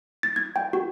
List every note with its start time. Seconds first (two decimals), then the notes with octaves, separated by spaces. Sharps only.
0.23 A6
0.36 G#6
0.56 G5
0.73 F#4